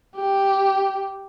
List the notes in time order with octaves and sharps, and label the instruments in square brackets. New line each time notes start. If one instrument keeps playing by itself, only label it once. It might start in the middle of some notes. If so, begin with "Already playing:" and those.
[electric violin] G4